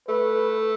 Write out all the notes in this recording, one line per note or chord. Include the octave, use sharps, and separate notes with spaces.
A3 B4